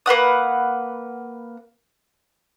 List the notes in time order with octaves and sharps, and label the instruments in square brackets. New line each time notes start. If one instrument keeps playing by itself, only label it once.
[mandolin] A#3 B4 F#5 D#6